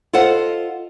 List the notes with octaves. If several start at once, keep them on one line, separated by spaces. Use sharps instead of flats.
F4 A4 C5 D#5 F#5